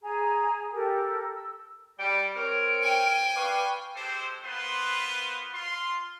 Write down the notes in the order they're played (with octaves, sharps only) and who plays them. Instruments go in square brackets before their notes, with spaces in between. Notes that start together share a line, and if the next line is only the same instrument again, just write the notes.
[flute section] G#4 G#5 A#5
G4 A4 A#4
E6
[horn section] G3 [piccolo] D7
[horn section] C4 A#4 C#5 [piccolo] D7
[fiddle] G5 G#5
[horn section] B4 D5 F5 [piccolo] C#6
[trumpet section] G#3 C4 G4 A4 C5
A#3 B3 F4 B4 C5 C6
F4 C6